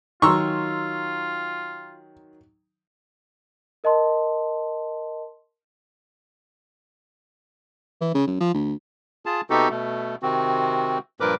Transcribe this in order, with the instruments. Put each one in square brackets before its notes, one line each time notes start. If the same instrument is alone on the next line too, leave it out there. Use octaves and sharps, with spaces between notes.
[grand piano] D#3 F#3 [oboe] F4 [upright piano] A#5 C6 E6 [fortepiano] C#6
[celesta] A#4 D#5 A5 C6
[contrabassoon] E3
C#3
F#2
F3
D2
[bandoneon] F4 G#4 A5
C3 B3 D#4 F#4 G4 A4
B2 A3
C3 D#3 C4 F#4
G2 A#2 F3 A#4 B4 D6